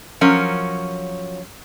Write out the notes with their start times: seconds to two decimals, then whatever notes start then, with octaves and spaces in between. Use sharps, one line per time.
0.21 F3 F#3 C#4 A#4